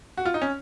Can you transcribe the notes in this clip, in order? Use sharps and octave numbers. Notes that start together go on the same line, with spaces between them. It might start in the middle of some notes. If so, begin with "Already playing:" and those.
F#4
F4
D#4
C#4